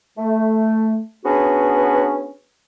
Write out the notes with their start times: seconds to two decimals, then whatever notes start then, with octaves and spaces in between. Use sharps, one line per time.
0.18 A3
1.24 B3 C#4 D4 F#4 G#4 B4